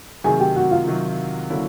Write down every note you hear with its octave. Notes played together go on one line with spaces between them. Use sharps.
C3 D#3 F#3 G#4 G#5
G4 G5
F#4 F#5
F4 F5
C3 D#3 F#3
D3 F#3 A#3 C#4 E4